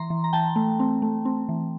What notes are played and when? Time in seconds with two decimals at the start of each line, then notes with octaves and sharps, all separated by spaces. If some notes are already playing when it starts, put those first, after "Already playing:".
Already playing: E3 A#5 C6
0.10 E3
0.24 A#5
0.33 E3 G5 A5
0.56 A3
0.80 C4
1.02 A3
1.25 C4
1.49 E3